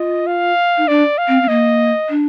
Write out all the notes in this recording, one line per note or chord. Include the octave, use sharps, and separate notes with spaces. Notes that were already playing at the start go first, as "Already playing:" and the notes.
Already playing: F4 D#5
F5
D#4
D4 D5
F5
C4
C4
A#3 D#5
D4